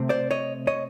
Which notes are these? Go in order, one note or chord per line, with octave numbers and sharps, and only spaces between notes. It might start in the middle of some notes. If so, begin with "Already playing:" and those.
Already playing: C3 A3 C4
C5 D5
C#5 D#5
C#5 D#5